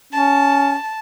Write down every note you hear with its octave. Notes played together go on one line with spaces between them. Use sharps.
C#4 A5